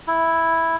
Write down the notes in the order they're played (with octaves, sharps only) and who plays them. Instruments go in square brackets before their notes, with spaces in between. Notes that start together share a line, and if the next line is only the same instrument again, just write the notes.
[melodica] E4